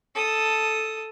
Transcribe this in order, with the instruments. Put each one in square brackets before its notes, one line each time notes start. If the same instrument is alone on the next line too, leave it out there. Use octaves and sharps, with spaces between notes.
[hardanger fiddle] A4 D#6